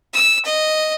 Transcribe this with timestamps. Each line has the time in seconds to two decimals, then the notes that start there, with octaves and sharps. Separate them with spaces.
0.13 E6
0.45 D#5